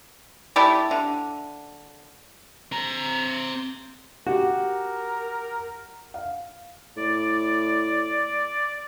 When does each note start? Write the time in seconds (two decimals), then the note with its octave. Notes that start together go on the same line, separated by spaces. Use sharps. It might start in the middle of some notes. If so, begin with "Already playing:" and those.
0.56 A3 E4 G4 D5
0.91 D3
2.72 C4 A#5
4.27 F#4 G4 A#4
6.14 F5
6.97 A2 D5